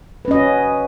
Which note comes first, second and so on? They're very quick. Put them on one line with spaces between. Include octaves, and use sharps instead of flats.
B4 C#4 D#5 F#4